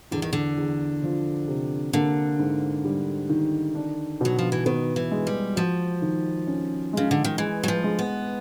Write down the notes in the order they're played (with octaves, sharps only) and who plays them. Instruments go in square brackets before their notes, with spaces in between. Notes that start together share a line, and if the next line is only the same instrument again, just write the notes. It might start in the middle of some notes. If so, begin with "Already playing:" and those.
[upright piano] E2 [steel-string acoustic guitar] D3
[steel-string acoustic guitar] D#3
D3
[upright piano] E2
F3
C3
[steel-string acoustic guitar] D3 [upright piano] A#3
[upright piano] G#2
G3
D#3
D4
[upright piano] B2 [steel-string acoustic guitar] F#3
[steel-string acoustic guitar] F3
E3
[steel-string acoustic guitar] D#3 [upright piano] B3
[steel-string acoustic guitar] E3
[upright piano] G#3
[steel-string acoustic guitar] G3
[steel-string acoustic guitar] F3 [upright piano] F#4
[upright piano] D#3
C#4
[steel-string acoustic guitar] C#3 [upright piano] G#3
[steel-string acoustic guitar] D3
D#3
[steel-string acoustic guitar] E3 [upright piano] G#3
[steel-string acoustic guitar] F#3
F3
[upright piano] G#3
[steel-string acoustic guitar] B3